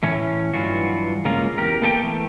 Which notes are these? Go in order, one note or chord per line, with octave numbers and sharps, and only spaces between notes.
A2 E3 C#4 C#5
G2 E3 F#3 F4 F#4
C#3 G#3 A#3 C#4 F4 A#5
E2 G4 A#4
A#3 B3 A4 E5 G5
E3 A3